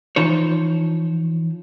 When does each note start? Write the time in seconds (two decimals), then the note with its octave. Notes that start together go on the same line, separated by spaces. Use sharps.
0.16 E3 F3 D#4 C5 C#5